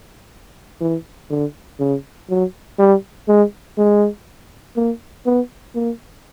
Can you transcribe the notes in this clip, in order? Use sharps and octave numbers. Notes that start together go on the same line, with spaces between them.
E3
D3
C#3
F#3
G3
G#3
G#3
A#3
B3
A#3